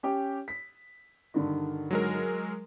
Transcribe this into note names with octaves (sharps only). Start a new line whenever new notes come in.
C#4 G4 G5
B6
G2 D3 D#3
F#3 G#3 A#4